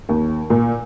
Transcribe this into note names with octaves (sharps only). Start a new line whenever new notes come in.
D#2
A#2